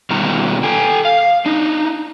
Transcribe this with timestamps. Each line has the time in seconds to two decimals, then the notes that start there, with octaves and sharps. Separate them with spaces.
0.11 B2 D#3 G3 F4 A#5
0.63 A4 G5 G#5
1.05 F5
1.46 D4 D#4